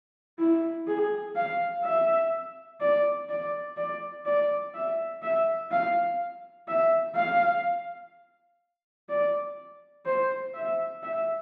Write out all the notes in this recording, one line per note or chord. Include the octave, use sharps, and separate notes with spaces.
E4
G#4
F5
E5
D5
D5
D5
D5
E5
E5
F5
E5
F5
D5
C5
E5
E5